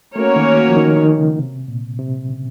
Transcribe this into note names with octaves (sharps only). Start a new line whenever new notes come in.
A3 A#3 C#4 F#4 A#4 C#5
D#3
F3
D#3
D#3
C#3
C3
A#2
C3
C#3